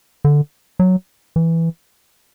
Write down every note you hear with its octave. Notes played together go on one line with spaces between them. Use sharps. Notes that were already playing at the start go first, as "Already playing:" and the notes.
D3
F#3
E3